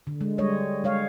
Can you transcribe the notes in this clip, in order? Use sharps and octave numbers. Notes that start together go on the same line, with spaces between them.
D3
G#3
G3 G#3 C#5 D#5
G#3 C#5 F5